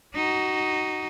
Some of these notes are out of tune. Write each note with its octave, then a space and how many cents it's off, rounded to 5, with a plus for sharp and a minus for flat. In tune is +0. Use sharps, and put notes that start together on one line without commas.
D#4 -5 F#4 +20